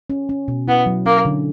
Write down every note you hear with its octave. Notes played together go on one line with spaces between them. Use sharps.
C#4
C#4
B2
B3 E4
F#3
A#3 C#4
D3